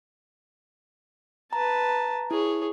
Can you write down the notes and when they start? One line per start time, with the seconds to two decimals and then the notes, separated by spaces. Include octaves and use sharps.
1.53 B4 A5 A#5
1.89 A#5
2.31 E4 G#4 C#5